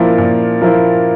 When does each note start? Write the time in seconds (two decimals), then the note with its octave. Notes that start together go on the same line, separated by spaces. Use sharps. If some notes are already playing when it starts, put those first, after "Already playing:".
Already playing: A#2 F3 A#3 E4
0.18 A#2
0.62 F3 A#3 E4